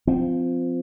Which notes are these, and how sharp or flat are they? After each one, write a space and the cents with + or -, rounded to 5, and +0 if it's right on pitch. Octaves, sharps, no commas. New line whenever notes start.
F3 +0 C4 -20